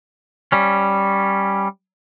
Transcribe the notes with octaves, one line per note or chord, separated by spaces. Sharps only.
G3 C#4